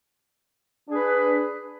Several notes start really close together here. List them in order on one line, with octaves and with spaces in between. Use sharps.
D4 G#4 B4